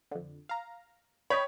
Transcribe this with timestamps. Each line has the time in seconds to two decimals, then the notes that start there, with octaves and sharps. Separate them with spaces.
0.11 F2 D3
0.49 F5 A#5
1.30 C#5 D#5 G5 B5